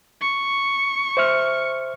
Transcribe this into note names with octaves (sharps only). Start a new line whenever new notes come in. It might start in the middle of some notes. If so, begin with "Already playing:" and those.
C#6
C5 E5 F6